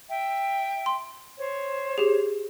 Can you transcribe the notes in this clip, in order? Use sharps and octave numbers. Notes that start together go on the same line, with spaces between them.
E5 G5
C6
C5 C#5
G4 G#4